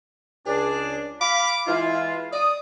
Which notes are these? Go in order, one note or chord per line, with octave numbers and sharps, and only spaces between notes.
C#2 D4 G#4
F5 B5 D6
E3 G#3 E4 F4
D5 D#6